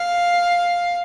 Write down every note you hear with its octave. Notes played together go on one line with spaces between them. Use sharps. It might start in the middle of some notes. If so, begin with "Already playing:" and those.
Already playing: F5